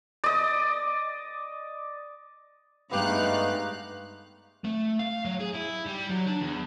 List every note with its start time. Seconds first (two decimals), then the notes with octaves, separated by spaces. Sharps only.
0.24 D5 D#5
2.91 G2 G#3 A3 B3 D#4 G4 F5 F#6
4.64 A3
4.99 F5
5.25 F#3
5.40 G#4
5.54 E4
5.86 G3
6.10 F#3
6.27 D4
6.41 E2